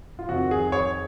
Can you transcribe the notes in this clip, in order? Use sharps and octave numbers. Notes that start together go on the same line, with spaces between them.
F4
F2 D#3 F#4
G#4
C#5